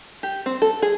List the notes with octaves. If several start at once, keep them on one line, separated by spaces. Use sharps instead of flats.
G4
C4
A4
G#4